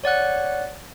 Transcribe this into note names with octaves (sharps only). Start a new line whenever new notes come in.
C#5 D5 F#5 F#6